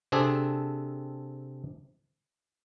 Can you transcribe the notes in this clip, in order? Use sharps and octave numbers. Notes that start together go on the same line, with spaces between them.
C3 C4 D4 G#4 A4